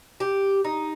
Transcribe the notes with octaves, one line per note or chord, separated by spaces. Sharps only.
G4
D#4